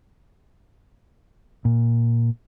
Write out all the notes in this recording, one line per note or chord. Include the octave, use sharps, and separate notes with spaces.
A#2